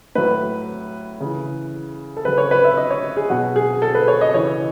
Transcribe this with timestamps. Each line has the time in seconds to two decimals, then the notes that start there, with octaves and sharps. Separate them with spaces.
0.15 A2 F#3 B4
1.20 C#3 E3
2.17 A4
2.25 C#3 F#3 B4
2.38 C#5
2.51 B4
2.64 E5
2.77 D#5
2.90 C#5
3.16 G#4
3.30 B2 F#3 F#4
3.56 G#4
3.82 A4
3.95 B4
4.08 C#5
4.21 D#5
4.34 C#3 E3 C#5